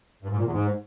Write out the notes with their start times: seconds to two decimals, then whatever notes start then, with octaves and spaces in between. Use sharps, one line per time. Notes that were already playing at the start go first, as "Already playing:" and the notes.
0.23 G2
0.30 G#2
0.38 A#2
0.45 E2
0.52 G#2